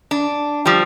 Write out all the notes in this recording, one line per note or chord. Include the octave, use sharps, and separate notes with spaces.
D4
F3 G3